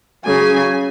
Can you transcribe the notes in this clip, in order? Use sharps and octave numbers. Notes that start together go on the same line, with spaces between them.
C#3 F#3 G#5